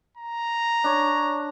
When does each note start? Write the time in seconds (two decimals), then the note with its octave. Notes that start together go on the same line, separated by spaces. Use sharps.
0.17 A#5
0.84 D4 C#5